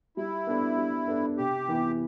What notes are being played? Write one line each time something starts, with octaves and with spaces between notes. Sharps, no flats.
G3 E4
B3 D4 A4
G3
B3 D4 A4
C3 G4
E3 B3 E4